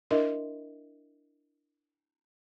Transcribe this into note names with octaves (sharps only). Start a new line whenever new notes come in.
D4 E4 A#4 D#5 E5